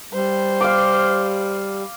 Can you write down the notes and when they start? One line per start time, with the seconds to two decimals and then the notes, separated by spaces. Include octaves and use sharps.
0.14 G3 C5
0.61 F5 D6